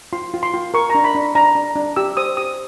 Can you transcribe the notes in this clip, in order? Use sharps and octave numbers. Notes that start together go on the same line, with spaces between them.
F4 C6
F4
C6
F4
A#4 C#6
A#5
D4
B5
D4
D4 A#5
D4
D4
G4 E6
C5 D#6
G4 D#6